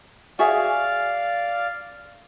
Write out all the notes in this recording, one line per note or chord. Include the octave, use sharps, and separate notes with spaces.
F#4 G#4 D5 E5 F5